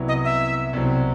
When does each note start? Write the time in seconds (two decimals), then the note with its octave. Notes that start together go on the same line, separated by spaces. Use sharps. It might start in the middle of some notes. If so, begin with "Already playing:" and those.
Already playing: C2 C3 F#3 B3 E4
0.08 D#5
0.25 E5
0.73 C2 B2 F#3 C4